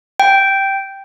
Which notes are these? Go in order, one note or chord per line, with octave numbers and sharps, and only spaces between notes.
G5